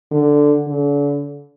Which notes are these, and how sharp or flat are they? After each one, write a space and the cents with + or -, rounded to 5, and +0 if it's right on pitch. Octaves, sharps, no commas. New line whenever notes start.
D3 +0
D3 -40